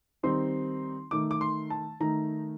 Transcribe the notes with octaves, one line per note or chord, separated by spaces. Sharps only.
D#3 G3 C4 D#4 C6
D#3 A3 D#4 D6
D6
C6
A5
D#3 A3 D#4 A#5